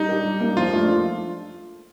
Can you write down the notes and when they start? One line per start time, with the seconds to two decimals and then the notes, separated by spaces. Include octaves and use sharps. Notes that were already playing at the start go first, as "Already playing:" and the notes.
Already playing: G3 D#4
0.08 D4 G4 A#4
0.25 G3
0.41 A#3 D4
0.57 F3 F4
0.73 A3 D4